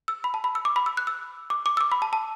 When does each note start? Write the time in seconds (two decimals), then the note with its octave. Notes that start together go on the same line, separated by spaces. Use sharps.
0.08 E6
0.24 B5
0.34 A5
0.44 B5
0.55 E6
0.65 D6
0.76 B5
0.86 E6
0.97 F#6
1.07 E6
1.50 D6
1.66 D6
1.77 E6
1.81 D6
1.92 B5
2.02 A5
2.13 A5